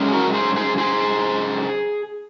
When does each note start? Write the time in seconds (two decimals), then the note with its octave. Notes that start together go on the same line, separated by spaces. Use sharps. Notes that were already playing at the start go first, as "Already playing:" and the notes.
Already playing: F#2 C#3 G#3 C#4
0.08 G#4
0.12 F#4 A#4
0.34 G#4 C5
0.56 G#4 C5
0.78 G#4 C5